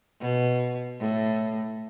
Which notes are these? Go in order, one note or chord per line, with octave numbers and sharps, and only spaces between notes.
B2
A2